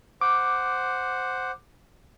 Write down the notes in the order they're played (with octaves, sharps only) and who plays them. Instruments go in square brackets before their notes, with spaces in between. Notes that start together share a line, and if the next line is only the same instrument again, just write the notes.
[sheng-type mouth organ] C5 F#5 [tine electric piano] D6